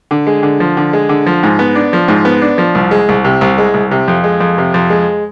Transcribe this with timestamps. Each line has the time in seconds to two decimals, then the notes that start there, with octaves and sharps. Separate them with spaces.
0.11 D3
0.27 G#3
0.43 D3
0.60 F3
0.77 D3
0.93 G#3
1.09 D3
1.26 F3
1.43 G#2
1.59 B3
1.75 D4
1.93 F3
2.08 G#2
2.25 B3
2.42 D4
2.58 F3
2.75 C2
2.91 G#3
3.09 C2
3.25 C3
3.41 C2
3.58 G#3
3.74 C2
3.91 C3
4.08 F2
4.24 G#3
4.40 F2
4.58 C3
4.74 F2
4.90 G#3